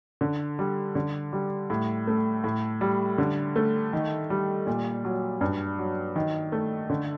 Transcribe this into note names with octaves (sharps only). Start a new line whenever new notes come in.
D3
G3
D3
G3
A2
A3
A2
G3
D3
A3
D#3
G3
A#2
F#3
G2
F#3
D#3
A3
D3